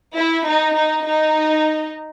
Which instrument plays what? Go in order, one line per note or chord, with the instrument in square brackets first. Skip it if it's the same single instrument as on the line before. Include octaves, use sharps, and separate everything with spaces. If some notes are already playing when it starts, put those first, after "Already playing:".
[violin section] E4
D#4
D#4
D#4